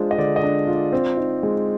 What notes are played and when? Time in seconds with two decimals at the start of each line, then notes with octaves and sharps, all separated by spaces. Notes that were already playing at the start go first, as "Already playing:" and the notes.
Already playing: G#3 D4 F4 C5
0.11 D#5
0.18 D3 D5
0.36 D#5
0.43 D4
0.67 F4
0.74 D5
0.93 C4
1.17 D#4
1.43 G#3